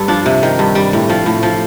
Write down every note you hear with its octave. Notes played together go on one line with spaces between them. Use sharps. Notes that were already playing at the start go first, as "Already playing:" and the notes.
Already playing: G2 A4
F3 D4
C3
D#3
G2
G3
A2
F3
A2
F3